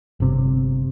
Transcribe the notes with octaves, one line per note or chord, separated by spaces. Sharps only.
G1 C3